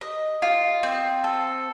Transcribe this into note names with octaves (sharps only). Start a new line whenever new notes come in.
D#5
F4
C4
A4